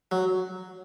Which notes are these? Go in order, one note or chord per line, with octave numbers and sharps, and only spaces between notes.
F#3